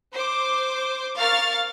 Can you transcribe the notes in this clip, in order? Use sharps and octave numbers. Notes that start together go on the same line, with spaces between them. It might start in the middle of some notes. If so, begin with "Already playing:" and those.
C5 D6
A#4 F5 C#6 F6 A6